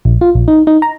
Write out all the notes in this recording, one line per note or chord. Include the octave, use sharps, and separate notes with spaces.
A#1
F4
A#1
D#4
D#4
A#5